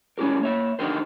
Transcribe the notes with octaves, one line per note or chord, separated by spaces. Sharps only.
G3 C#4 E4 G4 A#4
A#3 C#5 E5
D3 D#4 F#4 G4 A#4 C5